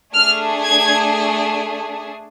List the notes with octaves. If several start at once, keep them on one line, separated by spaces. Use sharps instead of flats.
A3 D4 G#4 F6
G#6